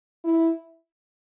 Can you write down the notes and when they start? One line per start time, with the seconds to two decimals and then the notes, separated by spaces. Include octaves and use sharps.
0.24 E4